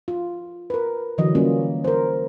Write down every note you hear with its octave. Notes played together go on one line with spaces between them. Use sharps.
F4
A#4 B4
D3 E3 F#3 D#5
F#3 G3 A#3 C#4 F4
A#4 C5